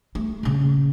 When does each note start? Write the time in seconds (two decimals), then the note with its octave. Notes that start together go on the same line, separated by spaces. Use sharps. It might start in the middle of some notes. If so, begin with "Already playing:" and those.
0.15 A3
0.43 A#1 C#3